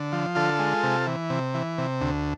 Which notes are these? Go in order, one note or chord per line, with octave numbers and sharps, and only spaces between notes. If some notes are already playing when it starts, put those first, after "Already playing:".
Already playing: D3
F3
D3 F4 A4
G#3
C3
E3
C3
E3
C3
D2